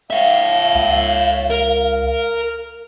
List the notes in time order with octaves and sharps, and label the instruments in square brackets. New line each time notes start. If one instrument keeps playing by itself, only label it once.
[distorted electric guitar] C#5 E5 [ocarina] F5
[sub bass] C#2
[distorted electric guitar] A#4